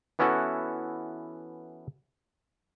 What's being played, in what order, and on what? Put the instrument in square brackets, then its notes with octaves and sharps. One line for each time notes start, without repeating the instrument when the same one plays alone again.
[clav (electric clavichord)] E3 B3 C#4 E4 F#4 A4